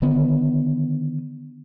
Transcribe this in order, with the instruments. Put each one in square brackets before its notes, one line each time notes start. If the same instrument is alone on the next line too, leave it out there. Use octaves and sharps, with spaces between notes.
[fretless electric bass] D3 D#3 B3